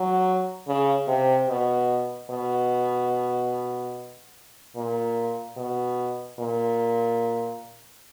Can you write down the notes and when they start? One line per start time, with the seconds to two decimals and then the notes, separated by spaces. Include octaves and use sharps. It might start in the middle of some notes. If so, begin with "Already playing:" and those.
Already playing: F#3
0.68 C#3
1.08 C3
1.49 B2
2.30 B2
4.76 A#2
5.57 B2
6.39 A#2